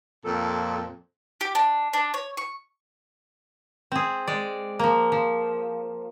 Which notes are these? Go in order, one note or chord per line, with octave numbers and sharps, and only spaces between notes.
F2 A#2 A4
G4
D4
D4
C#5
C#6
C4 G#4
G#3 D5
F3 A#3
F3